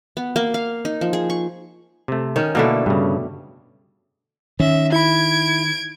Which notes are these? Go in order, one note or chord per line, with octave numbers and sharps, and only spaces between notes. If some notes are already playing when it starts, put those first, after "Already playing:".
B3
A#3
F5
D#4
F3
G#4
C#6
C3 A3
D#3 C#4
B2 D3 A3 A#3 D4 E4
G2 C#3
D#3 C#4 E5
E4 B5 G#6 D7